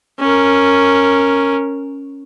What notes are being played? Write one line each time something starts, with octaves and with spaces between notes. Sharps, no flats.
C#4 A#4